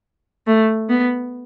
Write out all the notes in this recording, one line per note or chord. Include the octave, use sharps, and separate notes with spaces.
A3
B3